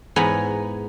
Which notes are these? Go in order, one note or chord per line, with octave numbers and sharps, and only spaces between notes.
E2 G#2 B3 G#5 A#5 B5